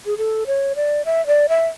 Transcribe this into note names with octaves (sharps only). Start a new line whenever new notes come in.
G#4
A4
C#5
D5
E5
D5
E5